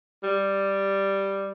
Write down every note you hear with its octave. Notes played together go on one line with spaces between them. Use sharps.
G3